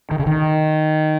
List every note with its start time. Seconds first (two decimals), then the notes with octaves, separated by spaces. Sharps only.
0.11 D#3
0.19 C#3
0.26 D#3